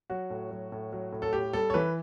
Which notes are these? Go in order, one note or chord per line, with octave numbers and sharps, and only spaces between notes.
F#3 F#4
A2
F#3
A2
F#3
A2
A4
A2 G4
G3 A4
C#5
E3 B4